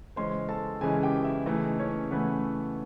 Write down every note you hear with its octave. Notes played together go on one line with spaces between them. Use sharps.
C#3 E3 G#3 C#4 C5 C6
A4 A5
C#3 E3 G#3 C#4 G#4 G#5
G4 G5
E4 E5
C#3 E3 A3 D#4 D#5
C#4 C#5
C#3 E3 A3 B3 B4